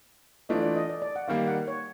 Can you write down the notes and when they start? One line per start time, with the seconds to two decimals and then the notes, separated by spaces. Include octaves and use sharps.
0.49 E3 A3 D4 F4 D#5
0.63 D5
0.76 D#5
0.90 D5
1.02 D5
1.16 F#5
1.28 D#3 G3 A#3 F5
1.48 F#5
1.68 C#5